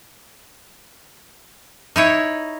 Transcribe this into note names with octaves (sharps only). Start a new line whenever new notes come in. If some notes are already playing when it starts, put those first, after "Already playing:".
D#4 E4 C#5